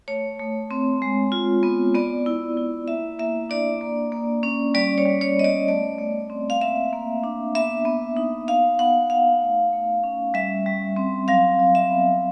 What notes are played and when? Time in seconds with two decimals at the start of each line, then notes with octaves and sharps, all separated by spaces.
0.08 A3 C#5
0.39 A3
0.71 C4
1.02 G#3
1.32 F4
1.63 B3
1.94 B3 D5
2.26 E4
2.57 E4
2.88 A#3 E5
3.19 A#3 E5
3.50 D4 D5
3.81 A#3
4.12 A#3
4.43 C#4
4.74 G3 D5
4.98 C#5
5.05 G3
5.21 C#5
5.37 B3 D#5
5.44 D5
5.68 A3 D5
5.99 A3
6.30 C4
6.50 F5
6.61 A#3 E5
6.93 A#3
7.24 D4
7.55 B3 E5
7.85 B3
8.17 D#4
8.48 B3 F5
8.79 B3 F#5
9.10 D#4 F5
9.41 A3
9.73 A3
10.04 C#4
10.34 G3 E5
10.66 G3
10.97 C4
11.28 F#3 F5
11.60 F#3
11.75 E5
11.90 B3